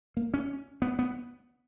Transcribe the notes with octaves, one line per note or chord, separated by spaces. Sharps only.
A#3
C#4
B3
B3